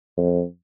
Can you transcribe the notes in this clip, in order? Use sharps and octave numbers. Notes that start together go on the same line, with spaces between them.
F2